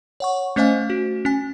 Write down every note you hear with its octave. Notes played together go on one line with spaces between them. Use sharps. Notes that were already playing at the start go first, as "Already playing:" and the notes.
C#5 F#5 C#6
A3 C#4 C5 D#5 F5 G#5
F#4
C#4 G#5